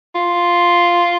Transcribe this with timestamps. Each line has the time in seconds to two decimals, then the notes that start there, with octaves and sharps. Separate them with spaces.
0.15 F4